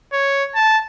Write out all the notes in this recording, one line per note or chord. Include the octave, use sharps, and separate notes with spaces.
C#5
A5